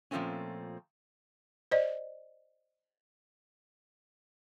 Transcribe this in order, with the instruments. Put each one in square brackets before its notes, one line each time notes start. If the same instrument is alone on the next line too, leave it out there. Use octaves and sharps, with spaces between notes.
[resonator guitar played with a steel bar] A#2 F3 G3 A3 C4 C#4
[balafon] C5 D5 D#5